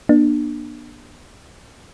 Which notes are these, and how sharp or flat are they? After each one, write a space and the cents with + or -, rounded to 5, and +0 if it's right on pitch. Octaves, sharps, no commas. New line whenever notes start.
B3 -45 D4 +25